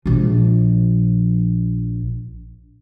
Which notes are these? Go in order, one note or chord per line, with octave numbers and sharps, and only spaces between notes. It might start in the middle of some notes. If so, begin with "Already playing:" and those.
A#1 F3